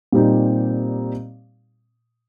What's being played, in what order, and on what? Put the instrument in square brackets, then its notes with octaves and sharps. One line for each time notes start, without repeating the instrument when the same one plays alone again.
[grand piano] A#2 G3 C4 D#4 G4